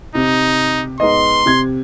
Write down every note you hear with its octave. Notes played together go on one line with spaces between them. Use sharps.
C3 D#4
G#2 B3 D#5 C6
C3 G#6